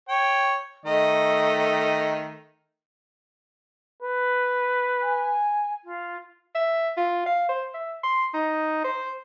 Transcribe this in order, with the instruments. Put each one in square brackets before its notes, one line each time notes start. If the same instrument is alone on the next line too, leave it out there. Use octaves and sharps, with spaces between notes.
[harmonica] C#5 G5
D#3 A3 D#5
[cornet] B4
[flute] G#5
F4
[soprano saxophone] E5
F4
F5
C5
E5
C6
D#4
C5